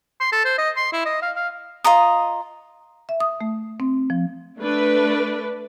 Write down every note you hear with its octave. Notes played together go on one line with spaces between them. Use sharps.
C6
A4
C5
D#5
C6
E4
D#5
F5
F5
F4 D#5 A#5 D#6
E5
D#6
A3
C4
F3
A3 D4 B4